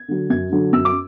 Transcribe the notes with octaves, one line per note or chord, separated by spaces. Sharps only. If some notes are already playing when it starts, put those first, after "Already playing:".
Already playing: G#6
D3 F#3
F#2 G#6
D3 F#3
F#2 E6
D6